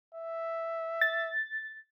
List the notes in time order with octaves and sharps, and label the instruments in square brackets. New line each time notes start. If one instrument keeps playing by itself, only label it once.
[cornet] E5
[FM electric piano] A6